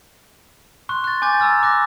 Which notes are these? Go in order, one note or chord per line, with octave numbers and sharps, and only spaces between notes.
C6 C#6 F#6
F#6 A6
G#5 D6 G6 A6
A#5 E6 F6 A6
D6 F#6 A#6